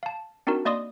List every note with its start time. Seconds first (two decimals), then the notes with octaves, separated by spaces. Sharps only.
0.03 F5 A5
0.47 C4 D4 D#4 F#4 A#4
0.65 A#3 D5 D#5 C6 D#6